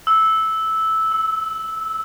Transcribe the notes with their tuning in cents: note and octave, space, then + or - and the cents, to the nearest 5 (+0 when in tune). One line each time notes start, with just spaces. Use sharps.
E6 -10
E6 -40